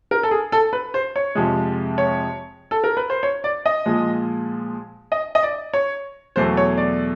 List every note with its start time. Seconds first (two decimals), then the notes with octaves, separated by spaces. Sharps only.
0.11 A#4
0.23 A4
0.31 G#4
0.52 A4
0.73 B4
0.94 C5
1.16 C#5
1.35 F2 C3 F3 G#3
1.98 C#5
2.71 A4
2.84 A#4
2.97 B4
3.10 C5
3.23 C#5
3.44 D5
3.66 D#5
3.86 A#2 F3 G#3
5.12 D#5
5.35 D#5
5.43 D5
5.73 C#5
6.36 E2 B2 F#3 A3 C5
6.57 C#5
6.77 D5